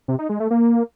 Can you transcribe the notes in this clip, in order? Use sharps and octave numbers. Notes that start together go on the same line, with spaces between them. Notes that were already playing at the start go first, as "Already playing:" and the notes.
C3
D#4
G#3
A3
A#3